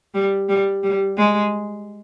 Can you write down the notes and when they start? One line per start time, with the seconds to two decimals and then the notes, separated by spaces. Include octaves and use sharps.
0.14 G3
0.49 G3
0.83 G3
1.17 G#3